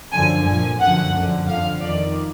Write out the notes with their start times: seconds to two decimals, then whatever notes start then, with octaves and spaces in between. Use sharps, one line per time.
0.12 F#2 D3 F3 G#5
0.46 A#2 F3 G#5
0.80 F#2 D3 F3 F#5
1.13 F#2 D3 F3
1.47 F2 D3 F3 F5
1.81 F2 D#3 D5